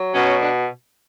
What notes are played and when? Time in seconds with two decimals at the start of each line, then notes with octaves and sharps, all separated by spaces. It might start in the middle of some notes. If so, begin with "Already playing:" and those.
Already playing: F#3
0.14 B2 C#4
0.41 D4